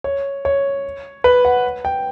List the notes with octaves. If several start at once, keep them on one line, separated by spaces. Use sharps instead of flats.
C#5
C#5
B4
F#5
G5